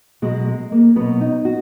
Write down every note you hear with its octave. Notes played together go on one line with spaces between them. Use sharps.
B2 F#3 G#3
G#3
A#3
B2 F#3 B3
D#4
F#4